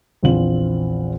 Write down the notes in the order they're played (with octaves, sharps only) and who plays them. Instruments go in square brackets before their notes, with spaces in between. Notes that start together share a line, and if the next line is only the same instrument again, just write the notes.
[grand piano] A#1 E2 C4 F4 F#7